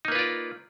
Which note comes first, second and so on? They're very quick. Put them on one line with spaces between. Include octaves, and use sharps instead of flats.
D#4 A#3 B4 F4 D5